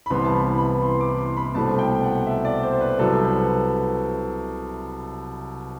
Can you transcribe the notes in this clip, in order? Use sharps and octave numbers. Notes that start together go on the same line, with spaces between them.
B5
C2 C3 E3 B3 C6
A5
B5
B5
C6
D6
C6
B5
C2 B2 A3 C4 A5
G5
F#5
E5
D5
C5
B4
C2 C3 F#3 A4
B4